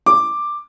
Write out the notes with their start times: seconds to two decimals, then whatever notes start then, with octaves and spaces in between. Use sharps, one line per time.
0.06 D6